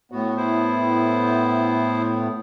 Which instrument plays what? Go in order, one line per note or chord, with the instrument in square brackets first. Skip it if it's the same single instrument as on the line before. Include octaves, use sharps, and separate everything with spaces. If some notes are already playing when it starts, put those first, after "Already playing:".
[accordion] A2 B3 [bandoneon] F#4
[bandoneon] E4 C5